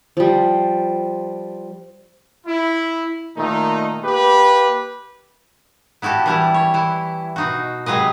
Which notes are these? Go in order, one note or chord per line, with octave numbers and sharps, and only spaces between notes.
F3 G3
E4
A#2 D#3 A3 D#4
A#3 G4 B4
B3 E4 F#4 G4 A4
E3 G3 E4
C#5
E3 E4
B2 D#4 F#4
C3 F#3 G#3 B4 D#5